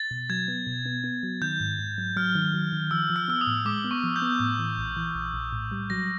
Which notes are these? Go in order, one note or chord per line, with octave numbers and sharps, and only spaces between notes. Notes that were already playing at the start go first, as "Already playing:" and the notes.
Already playing: A6
B2
F#3 G#6
B3
B2
B3
B3
F#3
D#3 G6
G#2
G#2
F#3
F#3 F6
D#3
F#3
D#3
F3 E6
F3
F6
B3 E6
D#6
A2
G#3 D6
B3
C#6
F3
G6
B3
A2
E3
A#1
E3
A#1
A#1
A2
G3
F#3 A#6